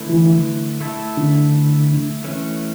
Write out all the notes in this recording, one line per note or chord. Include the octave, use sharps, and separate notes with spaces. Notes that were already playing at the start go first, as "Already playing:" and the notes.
Already playing: D3 A3 E4 B4
E3
A3 E4 A4
D3
E3 A3 C#4